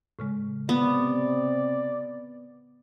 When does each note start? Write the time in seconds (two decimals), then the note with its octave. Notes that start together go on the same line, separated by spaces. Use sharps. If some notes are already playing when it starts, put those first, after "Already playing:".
0.19 A2 C#3 G#3
0.69 C3 B3 D5